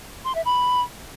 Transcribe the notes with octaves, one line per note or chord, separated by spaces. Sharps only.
C6
E5
B5